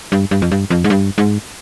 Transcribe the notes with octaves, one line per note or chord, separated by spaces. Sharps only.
G2
G2
F2
G2
F2
G#2
G2
G#2